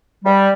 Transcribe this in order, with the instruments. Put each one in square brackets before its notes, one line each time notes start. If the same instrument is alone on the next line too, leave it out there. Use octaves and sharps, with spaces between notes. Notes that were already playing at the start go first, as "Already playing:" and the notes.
[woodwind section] G3